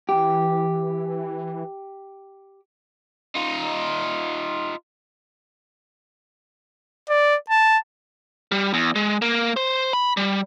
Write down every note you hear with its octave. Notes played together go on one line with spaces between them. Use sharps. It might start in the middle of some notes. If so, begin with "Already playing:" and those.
E3 G4
D#4 F4
D5
A5
G3
E2
G#3
A#3
C5
B5
G3